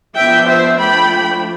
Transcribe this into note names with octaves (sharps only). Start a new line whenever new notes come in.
F3 B3 D4 E5 G5
C5 E5
F3 A3 D4 G5 B5